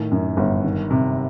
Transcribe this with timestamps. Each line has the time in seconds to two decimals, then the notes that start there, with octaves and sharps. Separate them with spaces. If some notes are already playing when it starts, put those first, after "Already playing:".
Already playing: A2 D#3
0.12 F#2
0.37 G1
0.64 D#3
0.91 C3